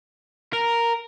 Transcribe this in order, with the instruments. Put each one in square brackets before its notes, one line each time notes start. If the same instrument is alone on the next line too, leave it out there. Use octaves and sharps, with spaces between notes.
[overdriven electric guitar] A#4